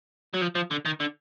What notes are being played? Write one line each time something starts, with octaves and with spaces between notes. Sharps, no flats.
F#3
F3
F3
D3
D#3
D3